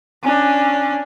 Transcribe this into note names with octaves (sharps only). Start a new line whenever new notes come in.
C#4 D4